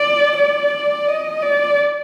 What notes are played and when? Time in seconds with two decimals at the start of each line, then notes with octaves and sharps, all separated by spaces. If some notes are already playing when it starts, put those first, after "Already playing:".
Already playing: D5
0.38 D5
1.08 D#5
1.42 D5